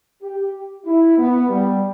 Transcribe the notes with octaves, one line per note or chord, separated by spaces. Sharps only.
G4
E4
B3
G3